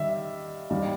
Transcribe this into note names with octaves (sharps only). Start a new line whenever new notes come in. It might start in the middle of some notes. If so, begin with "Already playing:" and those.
Already playing: D#3 G3 E5
D#2 D#3 G3